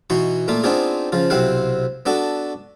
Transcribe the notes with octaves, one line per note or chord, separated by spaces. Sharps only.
B2 E3 D#4 F#4 C6 C#6
A#2 A3 A#3 F4
B3 C4 D4 D#4 F4 G#4
C#3 F3 F4
B1 C3 C4 E4 F5 F#5
B3 D4 F#4 A4